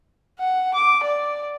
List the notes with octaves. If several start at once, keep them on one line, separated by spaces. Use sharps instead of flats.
F#5
D6
D5